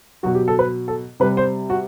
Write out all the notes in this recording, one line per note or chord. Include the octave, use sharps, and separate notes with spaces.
B2 F#3 F#4
G4
A4
B4
A4
C3 G3 B4
C5
F#4